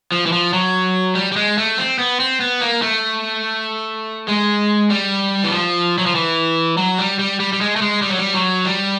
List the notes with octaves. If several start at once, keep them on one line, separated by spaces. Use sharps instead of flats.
F3
E3
F3
F#3
G3
G3
G#3
A3
C4
B3
C4
B3
A#3
A3
G#3
G3
E3
F3
F#3
F3
E3
F#3
G3
G3
G3
G3
G#3
A3
G#3
G3
F#3
G3
F#3
G3